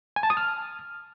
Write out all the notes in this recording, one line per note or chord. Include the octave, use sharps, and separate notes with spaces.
G#5
A5
D#6
F6